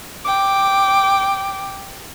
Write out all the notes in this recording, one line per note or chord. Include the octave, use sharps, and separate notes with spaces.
G5 D6